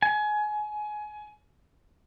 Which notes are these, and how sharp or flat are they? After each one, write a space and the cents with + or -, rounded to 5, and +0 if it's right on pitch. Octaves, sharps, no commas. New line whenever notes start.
G#5 +25